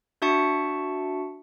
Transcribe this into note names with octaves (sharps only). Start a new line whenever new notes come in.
D4 F#4 E5 A5 C#6 C#7